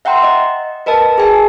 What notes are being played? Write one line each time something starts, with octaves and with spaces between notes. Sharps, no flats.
E5 F#5 G5 A#5 C6
D#5
A#4 B4 D#5 A5
G#4 G#5 A5